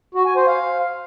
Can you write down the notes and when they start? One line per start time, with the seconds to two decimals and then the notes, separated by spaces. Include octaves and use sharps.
0.15 F#4
0.25 G#5
0.36 C5
0.47 F5